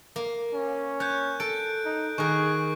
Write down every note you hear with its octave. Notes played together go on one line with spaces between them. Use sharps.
A#3
C#4
C#5 F#6 G6
A4 D7
D#4
D#3 G#4 A#4 C#6 F#6